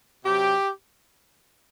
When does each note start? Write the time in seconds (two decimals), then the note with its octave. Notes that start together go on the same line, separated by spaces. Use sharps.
0.24 C3 F#3 G4